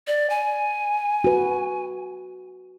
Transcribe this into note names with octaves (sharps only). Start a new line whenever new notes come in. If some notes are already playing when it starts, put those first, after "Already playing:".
D5
G#5
F#4 B4